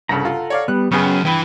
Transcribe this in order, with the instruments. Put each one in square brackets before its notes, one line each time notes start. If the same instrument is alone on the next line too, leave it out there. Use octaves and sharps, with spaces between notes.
[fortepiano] C2 G2 C#3 [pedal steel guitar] A4 F#5 A#5
[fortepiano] F4
C#5 D5 F5
[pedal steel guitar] G3 B3 [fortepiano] F#6
[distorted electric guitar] F#2 [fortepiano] C#3 B3 G#4 [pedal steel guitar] C#5 G5 F6
[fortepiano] G2 B5 [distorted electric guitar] E3 [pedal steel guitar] G5